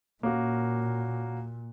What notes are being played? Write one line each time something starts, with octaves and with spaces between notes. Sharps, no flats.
A#2 A#3 C#4 F#4